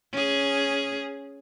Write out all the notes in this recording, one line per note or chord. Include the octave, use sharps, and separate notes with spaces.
C#4 G#4